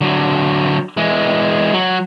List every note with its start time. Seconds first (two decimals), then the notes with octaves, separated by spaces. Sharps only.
0.01 D3 F#3
0.97 E3 G#3
1.74 F#3